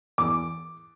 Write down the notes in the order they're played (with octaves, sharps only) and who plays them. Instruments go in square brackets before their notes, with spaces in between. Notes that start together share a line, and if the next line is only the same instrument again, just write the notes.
[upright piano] E2 D6